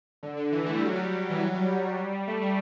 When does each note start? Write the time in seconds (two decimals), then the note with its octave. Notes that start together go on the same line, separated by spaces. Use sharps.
0.23 D3
0.37 D3
0.52 E3
0.66 A3
0.75 G3
0.85 F#3
0.95 G3
1.30 E3
1.40 F#3
1.54 G3
1.68 G3
1.97 G3
2.12 G3
2.28 A3
2.42 G3